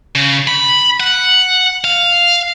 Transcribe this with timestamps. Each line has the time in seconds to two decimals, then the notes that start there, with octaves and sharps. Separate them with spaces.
0.15 C#3
0.47 B5
1.00 F#5
1.84 F5